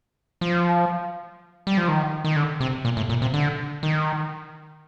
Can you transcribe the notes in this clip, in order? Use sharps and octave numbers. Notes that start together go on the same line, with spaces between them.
F3
G3
F3
D#3
D#3
D3
C3
A#2
A2
A#2
C3
D3
D#3